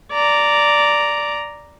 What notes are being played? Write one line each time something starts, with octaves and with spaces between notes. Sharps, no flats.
D5 A#5